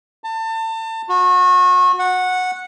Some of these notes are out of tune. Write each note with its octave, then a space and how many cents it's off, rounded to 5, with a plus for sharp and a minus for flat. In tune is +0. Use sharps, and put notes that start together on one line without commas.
A5 +30
F#4 -30
F#5 -10